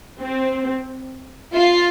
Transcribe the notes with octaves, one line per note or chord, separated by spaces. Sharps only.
C4
F4